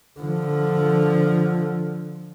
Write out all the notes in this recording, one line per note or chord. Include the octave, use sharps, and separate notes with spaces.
D3 F3